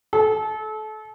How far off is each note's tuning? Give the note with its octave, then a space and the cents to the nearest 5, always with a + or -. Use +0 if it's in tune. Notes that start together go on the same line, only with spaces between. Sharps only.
A4 -30